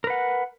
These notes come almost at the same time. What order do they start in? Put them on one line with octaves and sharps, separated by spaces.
A#4 B4 F#5